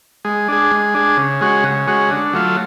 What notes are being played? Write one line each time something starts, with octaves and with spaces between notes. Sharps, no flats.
G#3
D4 G#4
G#3
D4 G#4
C#3
G#3 C#4 F#4
C#3
G#3 C#4 F#4
D3
F#3 A3 F4